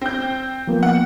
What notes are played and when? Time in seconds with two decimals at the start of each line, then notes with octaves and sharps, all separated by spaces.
0.01 C4 G6
0.67 F3 A#3 B3
0.83 F#5